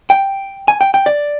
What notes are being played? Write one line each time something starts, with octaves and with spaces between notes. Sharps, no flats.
G5
G#5
G5
G5
D5